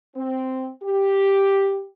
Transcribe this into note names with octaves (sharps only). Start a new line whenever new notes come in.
C4
G4